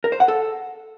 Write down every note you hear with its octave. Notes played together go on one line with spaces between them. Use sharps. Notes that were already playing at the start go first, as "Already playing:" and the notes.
A#4
C5
F#5
A4